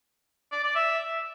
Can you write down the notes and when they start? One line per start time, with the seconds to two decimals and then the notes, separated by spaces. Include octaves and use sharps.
0.52 D5
0.64 D5
0.75 E5